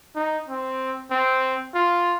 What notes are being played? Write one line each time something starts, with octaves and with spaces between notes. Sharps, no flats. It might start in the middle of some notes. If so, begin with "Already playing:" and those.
D#4
C4
C4
F4